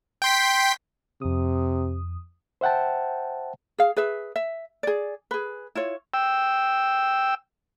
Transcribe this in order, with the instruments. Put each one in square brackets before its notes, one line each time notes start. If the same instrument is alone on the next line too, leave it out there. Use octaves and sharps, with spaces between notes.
[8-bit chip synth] G5 C6 B6
[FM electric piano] F2 D#6 [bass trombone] C3
[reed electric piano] C5 E5 F#5 G5 A5
[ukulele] G#4 F5
G#4 B4 E5
E5
G#4 D5
G#4 B4
E4 F4 C#5
[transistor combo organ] G5 E6